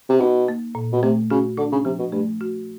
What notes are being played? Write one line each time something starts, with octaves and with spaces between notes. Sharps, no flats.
C3
B2 D#4
A#3
A#2
B2
C3 A3
C#3 F#4
D3 D4
C#3
C3 F3
B2
G2 A3
F#4